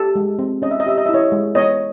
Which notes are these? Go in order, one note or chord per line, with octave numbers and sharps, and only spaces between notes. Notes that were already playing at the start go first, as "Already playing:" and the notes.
Already playing: G4 A4
G#3
C4
C#4 D#5
E5
D#5
G4 E5
D#5
E4 E5
C#5 D#5
G#3
B3 C#5 D#5